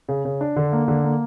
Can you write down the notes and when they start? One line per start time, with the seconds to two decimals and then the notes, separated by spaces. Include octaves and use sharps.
0.08 C#3
0.25 C#3
0.41 D4
0.56 D3
0.73 A#3
0.88 D3
1.04 A#3